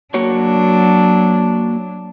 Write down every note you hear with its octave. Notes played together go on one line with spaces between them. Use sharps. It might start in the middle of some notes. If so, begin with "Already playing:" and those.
F#3 A#3 D4 F#4 C#5